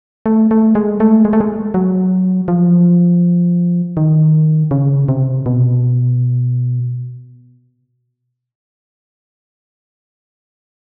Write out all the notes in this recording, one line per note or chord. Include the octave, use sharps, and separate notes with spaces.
A3
A3
G#3
A3
G#3
A3
G#3
F#3
F3
D#3
C#3
C3
B2